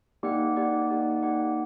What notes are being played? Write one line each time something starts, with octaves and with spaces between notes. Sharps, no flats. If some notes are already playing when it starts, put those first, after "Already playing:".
A#3 D#4 G4 D5 F#5
A#3 D#4 G4 D5 F#5
A#3 D#4 G4 D5 F#5
A#3 D#4 G4 D5 F#5